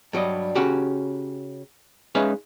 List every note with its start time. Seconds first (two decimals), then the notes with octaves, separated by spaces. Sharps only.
0.13 G2 F#3 G3 D#5
0.55 C#3 C#4 F#4 G4
2.15 G#3 C#4 D#4 B4 E5 F5